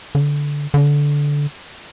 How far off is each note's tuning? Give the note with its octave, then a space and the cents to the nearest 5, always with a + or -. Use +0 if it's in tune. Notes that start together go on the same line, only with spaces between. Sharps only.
D3 -15
D3 -15